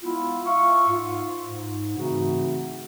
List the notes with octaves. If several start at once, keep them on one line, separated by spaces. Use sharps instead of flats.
G#3 B3 E4 F4
F4 E5 F5 C#6
G#2 F4
G#2
C#3 E3 A3 C4 D#4 F#4